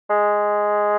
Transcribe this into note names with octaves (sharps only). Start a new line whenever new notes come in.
G#3